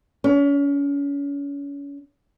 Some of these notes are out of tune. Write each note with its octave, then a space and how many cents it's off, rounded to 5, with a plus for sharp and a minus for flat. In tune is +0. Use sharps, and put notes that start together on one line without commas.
C#4 +35